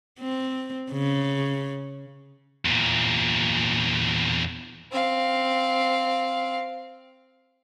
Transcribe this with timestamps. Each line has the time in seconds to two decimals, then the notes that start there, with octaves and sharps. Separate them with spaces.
0.20 C4
0.91 C#3
2.65 E2 A#2
4.92 C4 F5